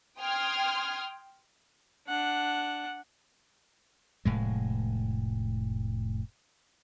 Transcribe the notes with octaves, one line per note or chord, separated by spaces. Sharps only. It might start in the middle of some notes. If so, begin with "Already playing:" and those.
G5 C6 D#6 F6 G#6
D4 F#5
F1 A2 G#3